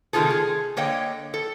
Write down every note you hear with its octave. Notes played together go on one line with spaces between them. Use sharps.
C3 D#3 A3 F4 G#4 A4
G#4
D3 A#3 C#5 D#5 G5
A4